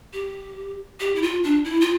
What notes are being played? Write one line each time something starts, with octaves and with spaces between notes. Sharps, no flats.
G4
G4
E4
F4
D4
E4
F4